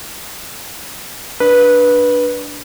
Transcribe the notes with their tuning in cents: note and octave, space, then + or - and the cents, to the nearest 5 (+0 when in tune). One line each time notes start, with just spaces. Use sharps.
D4 +0 B4 -15